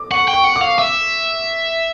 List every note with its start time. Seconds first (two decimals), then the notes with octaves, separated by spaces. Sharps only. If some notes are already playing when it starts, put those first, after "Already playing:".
Already playing: D6
0.11 F#5 C#6
0.28 G5
0.33 C#6
0.44 F#5
0.56 D6
0.61 F5
0.78 E5 D6